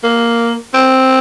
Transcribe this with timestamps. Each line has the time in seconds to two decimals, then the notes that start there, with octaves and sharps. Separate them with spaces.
0.04 A#3
0.74 C4